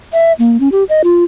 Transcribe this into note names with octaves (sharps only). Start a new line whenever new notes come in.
E5
A#3
C#4
G4
D#5
F4